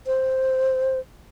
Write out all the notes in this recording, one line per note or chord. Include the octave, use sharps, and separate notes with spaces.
C5